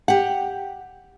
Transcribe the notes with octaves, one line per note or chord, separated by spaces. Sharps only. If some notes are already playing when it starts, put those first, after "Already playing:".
G4 F#5